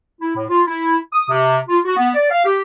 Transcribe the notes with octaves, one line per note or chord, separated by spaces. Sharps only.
E4
A2
F4
E4
D#6
C3
F4
F#4
B3
D5
F5
G4